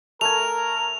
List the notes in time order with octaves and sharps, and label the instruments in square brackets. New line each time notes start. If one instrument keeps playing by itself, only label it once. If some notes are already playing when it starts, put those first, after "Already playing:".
[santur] A3 G#5 [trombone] A#4 [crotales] F7